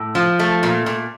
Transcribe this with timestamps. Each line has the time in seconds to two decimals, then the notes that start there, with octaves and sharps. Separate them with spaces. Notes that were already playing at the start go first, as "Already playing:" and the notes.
Already playing: A2
0.15 F3
0.39 A3
0.63 A#2
0.86 A#2